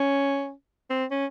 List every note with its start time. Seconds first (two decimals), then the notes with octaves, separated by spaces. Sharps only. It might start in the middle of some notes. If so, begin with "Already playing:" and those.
Already playing: C#4
0.90 C4
1.11 C#4